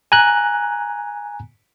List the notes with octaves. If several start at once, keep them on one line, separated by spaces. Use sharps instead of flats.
G#5 A#5 F#6